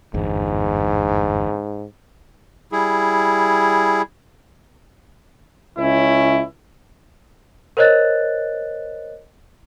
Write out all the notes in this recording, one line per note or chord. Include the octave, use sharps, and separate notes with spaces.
G1 E2 G#2
G3 E4 G#4
C#2 C#4 E4
A#4 C5 C#5 D#5 F#6 A6